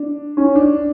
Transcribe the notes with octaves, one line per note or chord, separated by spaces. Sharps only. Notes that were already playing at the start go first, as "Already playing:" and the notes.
Already playing: D4
C#4
D4